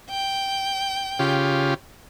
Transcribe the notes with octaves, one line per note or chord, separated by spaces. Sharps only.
G5
C#3 F4 G4